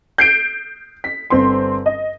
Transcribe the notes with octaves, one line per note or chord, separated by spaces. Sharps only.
G6 C7 D7
B6
G1 C4 C6
D#5